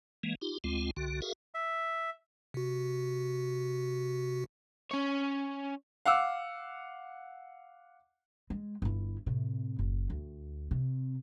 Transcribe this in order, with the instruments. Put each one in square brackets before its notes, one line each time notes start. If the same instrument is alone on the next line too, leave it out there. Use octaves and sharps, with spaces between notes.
[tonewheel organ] E3 G#3 A#3
D#4 F4 G4
D2 G#3 C4 F4
C2 D3 F#4
F#4 G#4 A#4 E5 F5
[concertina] E5
[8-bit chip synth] C3 F#4
[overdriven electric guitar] C#4 C#5
[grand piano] F5 F#5 D6 E6
[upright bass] G#3
G1 E4
A2 C3
F#1
D2
C3